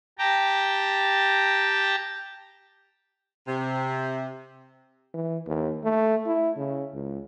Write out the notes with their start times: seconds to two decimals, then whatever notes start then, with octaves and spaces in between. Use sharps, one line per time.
0.19 G4 G5 A5 A#5
3.47 C3
5.14 E3
5.46 D#2
5.84 A3
6.27 E4
6.57 C#3
6.94 C#2